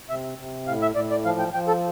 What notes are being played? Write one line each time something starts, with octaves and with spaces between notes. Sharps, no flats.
C3 E5
C3
A2 F5
E5
A2 D5
D5
F3 F5
G5
F3 G5
A4